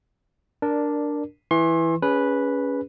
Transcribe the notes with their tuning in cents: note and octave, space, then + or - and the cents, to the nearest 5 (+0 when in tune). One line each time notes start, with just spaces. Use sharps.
D4 +0 A#4 +0 D5 +10
E3 +0 C6 +35
C#4 +20 G#4 -20 B4 -5